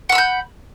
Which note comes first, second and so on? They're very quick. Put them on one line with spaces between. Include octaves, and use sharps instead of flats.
F#5 E6 B5 G6